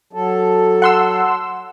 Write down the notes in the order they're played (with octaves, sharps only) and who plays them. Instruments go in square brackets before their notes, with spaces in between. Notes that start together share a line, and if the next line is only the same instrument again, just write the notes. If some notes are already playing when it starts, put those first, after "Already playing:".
[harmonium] F#3 A4
[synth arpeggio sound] F#5 C6 E6